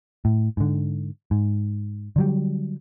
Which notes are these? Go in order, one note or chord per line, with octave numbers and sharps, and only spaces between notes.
A2
G#2 D3
G#2
D3 F#3 G3